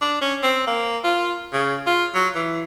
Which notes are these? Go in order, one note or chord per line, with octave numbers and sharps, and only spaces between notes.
D4
C#4
C4
A#3
F4
C#3
F4
F#3
E3